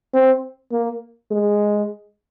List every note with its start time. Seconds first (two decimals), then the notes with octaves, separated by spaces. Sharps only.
0.14 C4
0.72 A#3
1.31 G#3